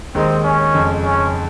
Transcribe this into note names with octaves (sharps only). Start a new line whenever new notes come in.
D#2 D#3 G#3 C4 D#4
C#4
F2 C#3 G#3
C#4